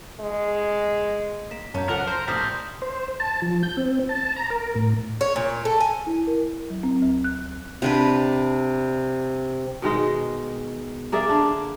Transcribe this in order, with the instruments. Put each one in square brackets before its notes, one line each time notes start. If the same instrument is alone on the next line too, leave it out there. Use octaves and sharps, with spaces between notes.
[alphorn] G#3
[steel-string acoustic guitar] A#3 [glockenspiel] B6 E7
[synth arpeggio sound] F#2 [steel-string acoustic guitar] C#4 F5 [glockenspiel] A5 A#5 G6
[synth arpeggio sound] C#2 F3 F#5 [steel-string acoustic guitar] A4 [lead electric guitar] A#4 [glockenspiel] F6
[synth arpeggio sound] C5 [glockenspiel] A#5 G6 A#6
[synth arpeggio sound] A#1 [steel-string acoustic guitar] A2 C3 [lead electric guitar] G3 C5 [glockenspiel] D6 D#6 B6
[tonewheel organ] C5
A5
F3
G6
C4
A5
A#5
A#4
A2
[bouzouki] C#5
A#2
A4
G#5
[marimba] E4
A#4
F#3
C4
D2
F#6
[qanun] C3 D4 B4
[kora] B2 D#3 G#3 D#5
A#3 G#4 D5 E5
D3 D4